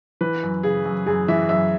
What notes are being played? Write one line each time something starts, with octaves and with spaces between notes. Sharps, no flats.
E3 B4
F#2
C#3 G#4
F#2
F#2 G#4
E3 E5
F#2 E5